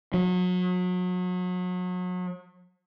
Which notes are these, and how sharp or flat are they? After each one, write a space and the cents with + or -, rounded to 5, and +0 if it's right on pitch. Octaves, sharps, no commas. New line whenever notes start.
F#3 -35